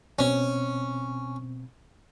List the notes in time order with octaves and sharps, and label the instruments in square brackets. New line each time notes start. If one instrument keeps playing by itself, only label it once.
[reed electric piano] B2 C4 [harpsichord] C#4